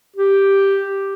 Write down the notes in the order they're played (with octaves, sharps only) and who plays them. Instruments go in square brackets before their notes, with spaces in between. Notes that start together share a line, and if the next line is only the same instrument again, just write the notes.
[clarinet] G4